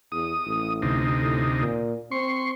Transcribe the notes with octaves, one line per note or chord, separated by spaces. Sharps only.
E2 D#6
A1
D2 C3 D#4
A2
A#2
C4 C6 C#6